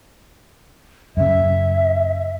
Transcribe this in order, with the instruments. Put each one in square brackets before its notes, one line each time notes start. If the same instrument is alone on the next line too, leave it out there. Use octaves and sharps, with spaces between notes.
[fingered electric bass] F#2 C#3 [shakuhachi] E5